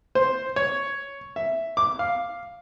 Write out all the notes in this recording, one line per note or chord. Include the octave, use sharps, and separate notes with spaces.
C5
C#5
E5
D6
F5